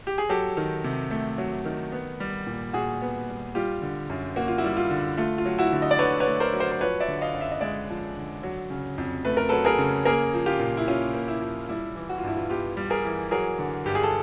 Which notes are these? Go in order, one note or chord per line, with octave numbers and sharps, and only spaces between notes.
G4
G#4
F#3 G4 A4
D#3
C3
A3
F#3
D#3
B3
G3
A#2
A#2 F#4 G#4
B3
G3
G3 F4 G4
D3
F#2
A#3 F#4
F4
E4 F#4
G3
F4
D3
A3 F4
F4
F#3
E4 F#4
D3
D#5
D5
D3 B4 C#5
B4 C#5
A3
A#4 C5
F#3
A#4 C5
C5
F3 B4 C#5
D5 E5
D3
D#5 F5
F#2
E5
D#5
G#3 D5 E5
F3
D3
F#3
C#3
F2
A3 B4
A#4
F#3 A4 B4
G#4 A#4
C#3
A#3 G#4 A#4
F3
F4 G4
A#2
E4
C#4 F4
A#3
E4
F3
G3 E4
E3
F#4
F4
G2 E4
F4
B3 F4 G4
G3
G#4 A#4
E3
F#3 G#4 A#4
D3
G2 G4
G#4
A4